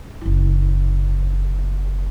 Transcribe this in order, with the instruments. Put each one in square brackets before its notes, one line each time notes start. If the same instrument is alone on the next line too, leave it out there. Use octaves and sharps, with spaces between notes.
[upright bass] F#1 E4